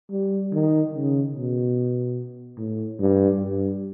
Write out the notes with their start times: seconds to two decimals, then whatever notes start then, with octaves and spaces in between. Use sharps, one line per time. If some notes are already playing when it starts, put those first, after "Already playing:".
0.11 G3
0.53 D#3
0.94 C#3
1.35 B2
2.58 A2
3.00 G2
3.41 G2